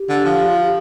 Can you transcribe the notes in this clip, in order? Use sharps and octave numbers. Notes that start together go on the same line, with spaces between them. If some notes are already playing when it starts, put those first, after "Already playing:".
Already playing: G4
D3
F3
F4
G4